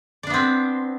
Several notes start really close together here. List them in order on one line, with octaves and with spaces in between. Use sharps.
D5 D4 B3 C4